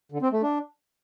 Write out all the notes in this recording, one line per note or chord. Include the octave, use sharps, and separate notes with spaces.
D3
C4
A3
D4